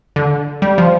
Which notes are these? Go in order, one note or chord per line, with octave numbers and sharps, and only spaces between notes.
D3
G3
F3